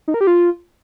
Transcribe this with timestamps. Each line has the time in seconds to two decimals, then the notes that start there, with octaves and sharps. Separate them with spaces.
0.08 D#4
0.14 A#4
0.21 G4
0.27 F4